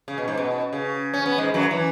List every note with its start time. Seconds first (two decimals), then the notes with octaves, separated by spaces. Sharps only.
0.08 C#3
0.18 B2
0.28 G#2
0.37 B2
0.73 C#3
1.14 C#4
1.26 B3
1.38 G#2 G#3
1.54 F#2 F#3
1.71 E3